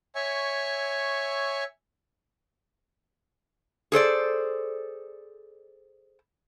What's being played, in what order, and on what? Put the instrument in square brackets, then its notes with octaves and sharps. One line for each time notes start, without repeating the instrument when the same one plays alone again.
[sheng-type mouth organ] C#5 E5 G#5 C#6
[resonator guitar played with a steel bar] G#4 A4 C5 D5